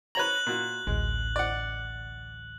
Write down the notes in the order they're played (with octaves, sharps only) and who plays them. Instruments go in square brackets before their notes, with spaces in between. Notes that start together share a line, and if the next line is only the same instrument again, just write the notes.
[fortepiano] B4 C#5 A#5 [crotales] F#6 F#7
[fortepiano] A#2 F#4
[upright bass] A1 D2 [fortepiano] G#3
[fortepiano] D5 F#5